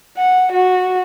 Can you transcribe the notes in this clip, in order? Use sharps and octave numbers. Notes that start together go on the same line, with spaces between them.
F#5
F#4